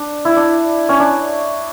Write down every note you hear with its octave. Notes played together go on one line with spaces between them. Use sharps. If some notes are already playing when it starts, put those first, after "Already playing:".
Already playing: D4
E4
D4
C#4
D4